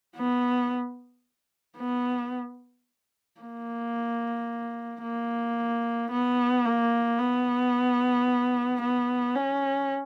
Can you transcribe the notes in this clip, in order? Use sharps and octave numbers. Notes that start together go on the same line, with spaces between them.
B3
B3
A#3
A#3
B3
A#3
B3
B3
C#4